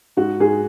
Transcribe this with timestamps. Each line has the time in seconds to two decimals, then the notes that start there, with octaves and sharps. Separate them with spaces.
0.17 G#2 F#4
0.40 G#2 G#4